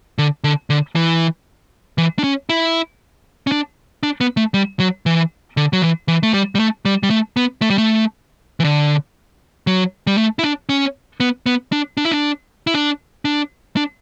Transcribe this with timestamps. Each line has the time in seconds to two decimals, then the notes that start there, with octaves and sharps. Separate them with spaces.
0.18 D3
0.44 D3
0.70 D3
0.96 E3
1.98 E3
2.19 D4
2.24 C#4
2.49 E4
3.47 C#4
3.52 D4
4.03 D4
4.21 B3
4.37 A3
4.54 G3
4.80 F#3
5.06 E3
5.57 D3
5.73 F#3
5.82 E3
6.08 E3
6.23 A3
6.34 G3
6.55 G3
6.59 A3
6.85 G3
7.03 G3
7.10 A3
7.37 B3
7.62 A3
7.70 G3
7.78 A3
8.60 E3
8.64 D3
9.67 F#3
10.07 G3
10.18 A3
10.39 E4
10.43 D4
10.69 C#4
11.20 B3
11.46 B3
11.72 D4
11.97 D4
12.05 E4
12.11 D4
12.67 E4
12.74 D4
13.25 D4
13.77 D4